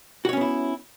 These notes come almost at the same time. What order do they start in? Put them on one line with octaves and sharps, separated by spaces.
F#4 C#5 C#4 B3 E4